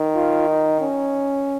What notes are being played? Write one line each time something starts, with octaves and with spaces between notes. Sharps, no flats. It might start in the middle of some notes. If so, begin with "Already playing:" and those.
Already playing: D#3
F4
D#4
C#4